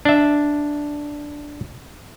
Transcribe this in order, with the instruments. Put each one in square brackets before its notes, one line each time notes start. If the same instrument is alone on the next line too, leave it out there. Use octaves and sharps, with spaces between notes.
[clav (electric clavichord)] D4 E5